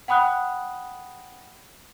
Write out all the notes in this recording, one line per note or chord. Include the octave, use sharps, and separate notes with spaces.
F#5 G5 B5 D#6 F#6